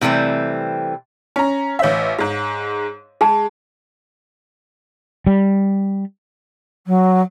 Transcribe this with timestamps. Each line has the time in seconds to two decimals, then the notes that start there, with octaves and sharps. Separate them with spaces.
0.01 C3 E3 G3 A3 C4
1.36 C#4 A#5
1.79 A1 C#5 E5 F5
2.19 G#2 G#3
3.21 G#3 G#4 A5
5.27 G3
6.86 F#3